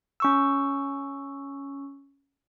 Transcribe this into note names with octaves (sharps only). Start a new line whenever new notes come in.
C#4 C#6 E6